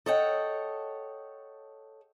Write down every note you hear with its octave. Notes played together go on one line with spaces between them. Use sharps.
A4 C#5 D#5 F#5 G5